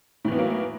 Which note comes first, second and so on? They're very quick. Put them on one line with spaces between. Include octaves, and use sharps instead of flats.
A2 E3 B3 F#3 A#3